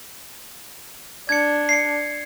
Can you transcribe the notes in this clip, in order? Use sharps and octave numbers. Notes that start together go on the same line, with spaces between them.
D4 G#6 C#7
C7 C#7